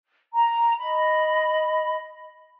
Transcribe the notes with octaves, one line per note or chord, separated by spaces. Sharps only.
A#5
D#5 B5